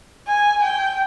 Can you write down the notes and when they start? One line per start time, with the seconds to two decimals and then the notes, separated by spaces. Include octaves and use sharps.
0.28 G#5
0.63 G5